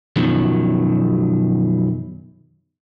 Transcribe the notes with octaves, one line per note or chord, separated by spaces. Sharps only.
F#2 B2 D#3 F3 F#3